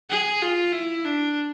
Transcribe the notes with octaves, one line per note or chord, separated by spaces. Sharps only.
G#4
F4
E4
D4